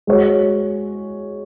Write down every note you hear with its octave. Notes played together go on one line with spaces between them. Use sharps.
G#3 F#4 C#5